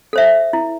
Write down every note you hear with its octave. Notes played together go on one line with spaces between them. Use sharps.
A4 C5 E5
E4